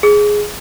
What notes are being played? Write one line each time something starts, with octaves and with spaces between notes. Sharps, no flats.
G#4